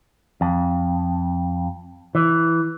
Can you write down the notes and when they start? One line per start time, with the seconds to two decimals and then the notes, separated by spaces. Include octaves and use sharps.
0.41 F2
2.15 E3